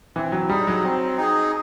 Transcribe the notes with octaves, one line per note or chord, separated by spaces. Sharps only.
E3 C4
F#3
G3 D#4 G#4
F#3
C4
D#4 G#4